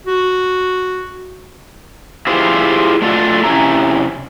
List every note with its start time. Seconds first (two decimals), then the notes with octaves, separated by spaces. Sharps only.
0.07 F#4
2.27 E4 F4 G4 G#4 C5
3.02 A3 D4 F4 F#4 A4
3.44 C3 C#4 E4 A#5